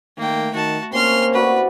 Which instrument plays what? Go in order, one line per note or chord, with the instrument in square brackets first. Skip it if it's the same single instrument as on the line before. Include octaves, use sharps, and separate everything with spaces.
[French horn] D#3 [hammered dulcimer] A3 [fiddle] A#3 G5
[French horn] D#3 [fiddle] F#4 A5
[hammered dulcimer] C3 C#4 [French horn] A#3 [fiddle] C6 F6
[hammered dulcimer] E4 F#4 D5 [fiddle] B4